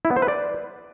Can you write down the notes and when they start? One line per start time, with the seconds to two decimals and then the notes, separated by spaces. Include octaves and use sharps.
0.05 E4
0.11 B3
0.16 C5
0.22 B4
0.28 D5